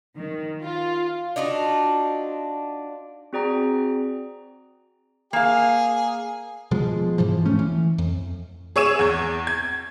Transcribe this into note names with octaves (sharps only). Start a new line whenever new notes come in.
D#3
F4
D4 D#4 F4 F#4
C4 F#4 G#4 D5 G5 A#5
A#3 G#4 F5
B2 F3 G#3
G#2 E3 F3
D1 A3 C#4
E3
F2
G#4 C#5 C#6 E6 D#7 E7
E2 G#6
G#6